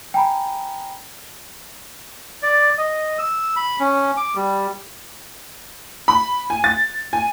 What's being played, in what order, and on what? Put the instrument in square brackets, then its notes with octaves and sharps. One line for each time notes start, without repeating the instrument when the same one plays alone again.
[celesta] G5 G#5 A#5 B5
[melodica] D5
D#5
E6
B5
C#4
D6
G3
[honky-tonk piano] B5
G#5
A6
G#5